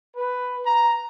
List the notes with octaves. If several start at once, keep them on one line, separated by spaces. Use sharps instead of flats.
B4
A#5